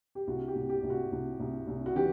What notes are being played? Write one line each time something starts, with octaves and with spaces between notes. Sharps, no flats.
G4
C2 F#4
G4
C2
G4
C2
F#4
C2
C2
C2
F#4
E3 G4